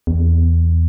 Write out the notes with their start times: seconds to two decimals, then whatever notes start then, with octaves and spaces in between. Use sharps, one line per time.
0.07 E2